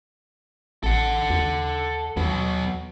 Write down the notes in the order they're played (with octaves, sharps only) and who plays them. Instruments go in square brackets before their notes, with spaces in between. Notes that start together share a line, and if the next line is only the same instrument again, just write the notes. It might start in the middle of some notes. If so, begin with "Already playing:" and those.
[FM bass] A1 [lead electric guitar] A4 F#5
[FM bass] D#2
[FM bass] D#2 [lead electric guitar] F#3 B3